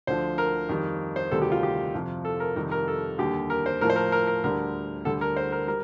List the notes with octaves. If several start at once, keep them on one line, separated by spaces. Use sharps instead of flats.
D2 D3 F3 C5
A#4
F2 D#3 G3
C5
D2 C3 D#3 G3 A4
G4
F4
G4
F2 C3 F3
A4
A#4
F2 C3 D#3 G3 A#4
A#4
A4
D#2 D3 G3 G4
A#4
C5
A2 F3 A#4
C5
A#4
A#4
A#4
D2 D3 G3 A#4
D2 D3 G3 A4
A#4
C5
A#4
G3 A#4